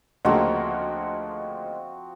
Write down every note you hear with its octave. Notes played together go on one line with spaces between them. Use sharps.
D2 C#3 F3 A#3 C4 F#4 D#5